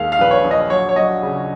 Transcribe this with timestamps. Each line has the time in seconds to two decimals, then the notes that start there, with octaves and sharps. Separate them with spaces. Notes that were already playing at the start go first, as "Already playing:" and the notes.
Already playing: D#2 G#3 F5
0.12 F5
0.19 A#1 B4
0.31 C#5
0.45 A#1
0.51 D#5
0.70 F#3 C#5
0.89 C#5
0.96 F#3 D#5
1.22 C#3